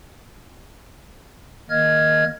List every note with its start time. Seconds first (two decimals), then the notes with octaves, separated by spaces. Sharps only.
1.70 D#3 A#3 D#5 F6 G#6